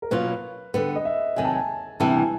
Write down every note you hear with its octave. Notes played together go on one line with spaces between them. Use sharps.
A#4
B2 F#3 A#3 C#4 F4 B4
D3 G3 B3 B4
D#5
E5
C3 D#3 F#3 G#5
A5
G#5
C3 E3 G3 B3 D4 A5
G#5